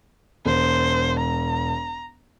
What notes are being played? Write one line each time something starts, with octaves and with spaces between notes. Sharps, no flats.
E1 C5
A#5